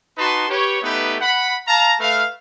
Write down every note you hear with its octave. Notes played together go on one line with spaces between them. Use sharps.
D#4 F#4 B4 A5 C6
G4 B4 C#5
A3 B3 D#4 G4 B4
F#5 B5
F5 A5 A#5
A3 B4 F5